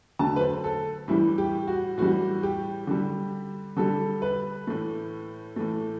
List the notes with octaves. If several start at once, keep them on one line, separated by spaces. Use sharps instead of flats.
D3 F#3 A3 A5
B4
C5
A4
A2 E3 G3 E4
G4
F#4
A2 E3 G3 F#4
G4
D3 G3
D3 G3 A4
B4
A2 E3 A3
A2 E3 A3